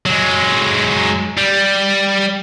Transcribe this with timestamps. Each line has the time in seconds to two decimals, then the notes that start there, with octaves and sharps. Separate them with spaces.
0.06 F#3 G#3
1.38 G3